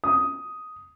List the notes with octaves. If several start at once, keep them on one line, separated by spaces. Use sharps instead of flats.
D#6